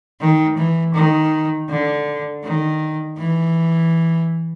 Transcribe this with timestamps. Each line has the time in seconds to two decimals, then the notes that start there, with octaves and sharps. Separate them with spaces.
0.20 D#3
0.57 E3
0.95 D#3
1.69 D3
2.44 D#3
3.18 E3